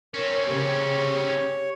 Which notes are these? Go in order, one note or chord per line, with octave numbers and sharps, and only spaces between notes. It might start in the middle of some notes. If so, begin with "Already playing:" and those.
C4 C#4 A#4 C#5
C#3 G4 C#5